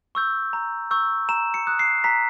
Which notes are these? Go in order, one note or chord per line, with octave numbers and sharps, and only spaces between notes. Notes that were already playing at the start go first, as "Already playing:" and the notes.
C#6 E6 G6
A#5
C#6 E6 G6
A#5 E7
C#7
D#6 F#6
C7
A#5 B6